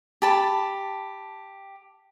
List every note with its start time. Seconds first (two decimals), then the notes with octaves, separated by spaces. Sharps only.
0.22 G4 A5 B5